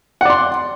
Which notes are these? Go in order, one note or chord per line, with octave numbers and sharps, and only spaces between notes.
D5 F#5 C6